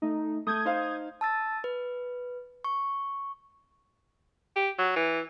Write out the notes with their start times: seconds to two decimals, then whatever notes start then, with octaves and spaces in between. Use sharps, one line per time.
0.02 A3 D#4
0.47 A3 D#6 G6 G#6
0.65 D#4 C5 F5
1.21 A5 E6 A6
1.64 B4
2.64 C#6
4.56 G4
4.78 F#3
4.96 E3